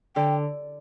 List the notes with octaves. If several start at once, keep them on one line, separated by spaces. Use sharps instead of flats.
D3 G5